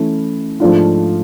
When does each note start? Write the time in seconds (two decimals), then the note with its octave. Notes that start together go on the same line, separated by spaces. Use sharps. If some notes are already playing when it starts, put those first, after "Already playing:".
Already playing: E3 A3 C#4 E4
0.60 G#2 F3 A3 D4 F4